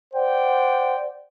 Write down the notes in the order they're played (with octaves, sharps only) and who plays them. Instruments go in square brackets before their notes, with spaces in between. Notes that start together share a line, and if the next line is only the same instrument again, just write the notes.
[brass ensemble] C5 D5 F#5 G5